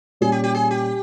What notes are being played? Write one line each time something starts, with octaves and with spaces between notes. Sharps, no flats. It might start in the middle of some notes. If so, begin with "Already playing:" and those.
A#2 G3 C#4 G#4
G4
G4
G#4
G4